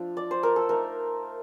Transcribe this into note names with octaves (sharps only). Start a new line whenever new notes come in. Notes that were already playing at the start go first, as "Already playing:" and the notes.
Already playing: F3 A3 D4 F4
D5
C5
A#4
A4
A3 D#4 A#4